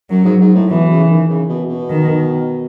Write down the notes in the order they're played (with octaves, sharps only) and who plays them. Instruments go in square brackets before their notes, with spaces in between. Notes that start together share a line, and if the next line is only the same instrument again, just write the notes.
[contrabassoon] F#2 [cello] F#3
[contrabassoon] G#2
G#2
A2
[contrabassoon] B2 [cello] E3
[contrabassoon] C#3
D#3
C#3
B2
B2
[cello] D#3